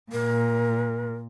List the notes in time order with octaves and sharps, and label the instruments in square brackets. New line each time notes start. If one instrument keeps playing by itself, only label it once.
[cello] A#2 [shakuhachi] A#4